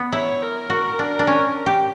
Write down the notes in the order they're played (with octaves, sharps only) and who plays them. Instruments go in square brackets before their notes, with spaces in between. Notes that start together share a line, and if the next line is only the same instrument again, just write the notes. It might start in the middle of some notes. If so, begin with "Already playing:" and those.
Already playing: [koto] B3
[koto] E4 [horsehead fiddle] C#5
[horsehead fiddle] A#4
[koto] F#4
D4
D4
C#4
G4